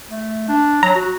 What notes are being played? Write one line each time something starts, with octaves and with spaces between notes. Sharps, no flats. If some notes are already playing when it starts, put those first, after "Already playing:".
A3
D4
F#3 A#5
F#4